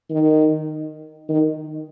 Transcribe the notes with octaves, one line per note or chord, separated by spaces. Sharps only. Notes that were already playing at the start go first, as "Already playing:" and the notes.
D#3
D#3